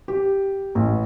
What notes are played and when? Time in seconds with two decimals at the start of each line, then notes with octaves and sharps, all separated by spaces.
0.08 G4
0.75 A1